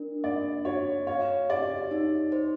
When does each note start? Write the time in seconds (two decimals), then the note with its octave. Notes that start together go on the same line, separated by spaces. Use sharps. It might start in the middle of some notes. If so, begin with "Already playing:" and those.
Already playing: D4 A#4
0.24 A#3 D5
0.65 F#4 C#5
1.07 C#5 F5
1.50 G4 D5
1.91 D#4
2.32 C5